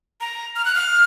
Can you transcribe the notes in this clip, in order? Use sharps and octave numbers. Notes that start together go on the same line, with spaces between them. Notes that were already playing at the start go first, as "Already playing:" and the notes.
A#5
F6
F#6
F6